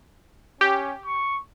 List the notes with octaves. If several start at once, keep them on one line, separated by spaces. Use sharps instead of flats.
C#4 G4
C#6